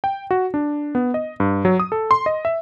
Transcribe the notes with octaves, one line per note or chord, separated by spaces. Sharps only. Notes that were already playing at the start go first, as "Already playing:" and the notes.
G5
F#4
D4
B3
D#5
G2
F#3
D#6
A4
C6
D#5
E5